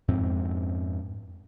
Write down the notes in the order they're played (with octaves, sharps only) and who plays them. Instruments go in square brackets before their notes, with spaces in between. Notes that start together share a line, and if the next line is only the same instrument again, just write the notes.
[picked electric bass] F2 G#2 C4